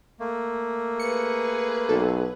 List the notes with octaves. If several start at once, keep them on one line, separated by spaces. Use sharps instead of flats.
A3 A#3
G#4 B4 C#7
B1 A4